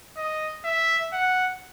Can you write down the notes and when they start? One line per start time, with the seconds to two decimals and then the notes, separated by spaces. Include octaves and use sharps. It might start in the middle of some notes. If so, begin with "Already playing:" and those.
0.17 D#5
0.64 E5
1.12 F#5